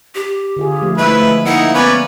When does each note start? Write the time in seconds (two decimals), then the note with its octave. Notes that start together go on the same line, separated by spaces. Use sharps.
0.15 G4
0.57 D3 F4 G#4
0.82 F3 A3
0.98 G#3 A3 E4 B4 E5
1.45 A#3 D#4 E4 F#5
1.74 B3 C#4 B4 D5